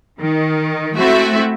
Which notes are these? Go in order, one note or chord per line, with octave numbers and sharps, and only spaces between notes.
D#3
A3 C4 E4 F#4 E5